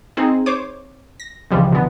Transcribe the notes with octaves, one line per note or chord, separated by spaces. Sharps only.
C4 D#4 G#4
C5 C#5 D6
A#6
C#2 C#3 E3 F3 G3 G#3
B2 D3 E3 B3